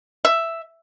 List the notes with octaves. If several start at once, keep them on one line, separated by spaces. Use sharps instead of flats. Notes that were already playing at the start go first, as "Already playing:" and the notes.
E5